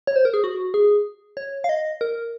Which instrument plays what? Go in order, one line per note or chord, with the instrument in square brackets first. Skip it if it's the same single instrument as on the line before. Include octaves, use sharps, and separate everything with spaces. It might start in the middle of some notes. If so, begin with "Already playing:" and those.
[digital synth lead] C#5
C5
A#4
G#4
F#4
G#4
C#5
F5
D#5
A#4